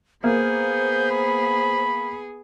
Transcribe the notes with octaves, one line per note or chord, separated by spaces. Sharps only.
A#3 B3 G#4 C5 G6
B5